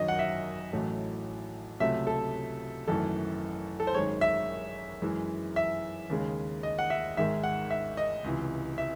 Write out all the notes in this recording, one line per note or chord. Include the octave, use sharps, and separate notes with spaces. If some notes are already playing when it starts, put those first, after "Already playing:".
Already playing: G#1 F#2 D#3 F#3 D#5
F#5
E5
A1 A2 F#3 A3
C#2 C3 F#3 A3 E5
A4
G#1 F#2 E3 A3 A4
A4
C5
G#1 F#2 D#3 G#3 C#5
E5
F#2 E3 G#3
E5
D#2 C#3 G#3
D#5
F#5
E5
G#1 G#2 D#3 G#3 E5
F#5
E5
D#5
C#2 C3 E3
E5